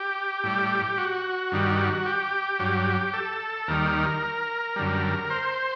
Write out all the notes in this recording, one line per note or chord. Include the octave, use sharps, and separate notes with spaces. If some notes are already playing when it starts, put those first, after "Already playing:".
Already playing: G4
A2 G3
F#4
G2 D#3 G3
G4
G2 F#3
A4
D#2 D#3 G3 A#4
F#2 D3 G3
C5